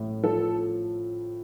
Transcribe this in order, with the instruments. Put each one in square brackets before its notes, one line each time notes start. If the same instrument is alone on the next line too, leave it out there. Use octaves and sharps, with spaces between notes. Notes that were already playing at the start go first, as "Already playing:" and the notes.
Already playing: [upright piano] A1 A2
[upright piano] F3 [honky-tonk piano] A4